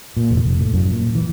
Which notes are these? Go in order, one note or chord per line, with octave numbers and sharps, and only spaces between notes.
A#2
F1
F1
A2
F#2
A#2
E3